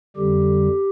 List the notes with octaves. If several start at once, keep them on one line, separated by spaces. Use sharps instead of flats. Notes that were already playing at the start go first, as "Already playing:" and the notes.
F2 D3 G3 G4